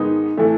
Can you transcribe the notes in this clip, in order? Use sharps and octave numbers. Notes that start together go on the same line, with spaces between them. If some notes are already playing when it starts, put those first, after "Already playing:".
Already playing: G#2 D#3 G#3 B3 D#4
A2 E3 A3